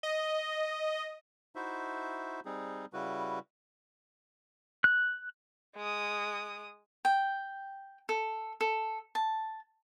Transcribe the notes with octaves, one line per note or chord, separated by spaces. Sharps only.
D#5
D#4 E4 F#4 C5 E5
G3 C4 D#4 G#4
C#3 G3 E4 F#4 B4
F#6
G#3 D#6
G5
A4
A4
A5